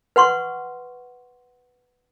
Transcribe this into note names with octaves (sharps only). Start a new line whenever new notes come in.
B4 F#5 C6 C#6